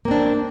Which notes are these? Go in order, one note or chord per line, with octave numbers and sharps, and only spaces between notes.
A#3 C4 D4